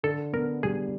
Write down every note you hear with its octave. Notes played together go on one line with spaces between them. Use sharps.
D3 A4
B3 A#4
G3 G#4